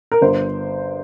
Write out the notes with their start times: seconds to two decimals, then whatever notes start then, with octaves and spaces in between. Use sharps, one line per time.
0.12 A#4
0.22 G1 C5